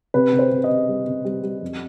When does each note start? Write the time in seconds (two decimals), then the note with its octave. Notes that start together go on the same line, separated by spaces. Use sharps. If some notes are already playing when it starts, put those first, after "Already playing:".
0.14 C3 B4
0.33 C3
0.39 C5
0.51 C3
0.64 D#5
0.69 C3
0.88 G3
1.07 C3
1.25 G3
1.43 G3
1.62 F2